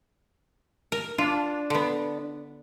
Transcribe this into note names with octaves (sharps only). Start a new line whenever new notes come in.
A#4
D4 F4
D3 B3